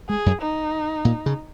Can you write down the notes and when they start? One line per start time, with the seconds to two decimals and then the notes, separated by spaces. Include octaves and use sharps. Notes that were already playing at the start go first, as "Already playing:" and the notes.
0.09 G#3 G#4
0.26 F#2
0.42 D#4
1.05 A#2
1.26 C#3